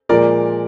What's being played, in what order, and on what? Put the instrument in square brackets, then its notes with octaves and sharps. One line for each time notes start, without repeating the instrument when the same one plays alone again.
[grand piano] A#2 F3 G#3 A#4 D5